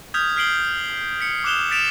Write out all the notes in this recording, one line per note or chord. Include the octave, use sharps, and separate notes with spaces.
D#6 F6 G6 G#6 B6 F7
F6 B6 C7 D7 F#7 G7
B6 C#7
D6 D#6 F#6 E7 F7 G7
A6 B6 D7 E7 F7